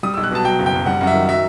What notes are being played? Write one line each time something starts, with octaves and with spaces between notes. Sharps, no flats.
G3 D#6
E6
B1
F#6
B2 A5
F#3 G5
F#1
G5
F#2
G3 F#5
F#2 F#5
E5
D#3
F#3 E5